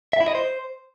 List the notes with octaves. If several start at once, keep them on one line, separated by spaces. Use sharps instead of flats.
E5
E4
D#5
C5